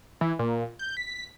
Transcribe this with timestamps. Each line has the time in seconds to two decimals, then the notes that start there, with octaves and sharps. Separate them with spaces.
0.21 E3
0.39 A#2
0.79 G6
0.97 B6